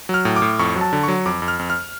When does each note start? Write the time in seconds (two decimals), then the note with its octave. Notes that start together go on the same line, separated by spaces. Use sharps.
0.09 F#3 F6
0.25 A2
0.36 D6
0.42 A2
0.59 F2 C#6
0.76 F#3
0.81 A5
0.93 D3
1.03 F#3 C#6
1.26 F2 D6
1.42 F2
1.48 F6
1.59 F2
1.70 F6